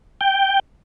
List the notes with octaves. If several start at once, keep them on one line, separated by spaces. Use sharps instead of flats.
G5